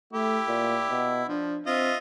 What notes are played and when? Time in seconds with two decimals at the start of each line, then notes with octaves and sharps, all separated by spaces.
0.13 A3 E4 G4
0.48 A#2
0.90 B2
1.28 F3 D4
1.66 C4 F4 D#5 E5